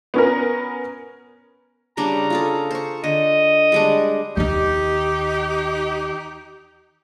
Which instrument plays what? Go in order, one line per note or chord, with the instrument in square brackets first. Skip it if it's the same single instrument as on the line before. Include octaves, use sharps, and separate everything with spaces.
[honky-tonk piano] B3 C#4 A#4
[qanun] C#3 G3 D4 [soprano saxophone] A#5
[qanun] F4 G#4 A4
C5 C#6
[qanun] D3 [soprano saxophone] D#5
[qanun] G3 G#3 D4
[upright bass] D#2 D#3 [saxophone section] D#4 G4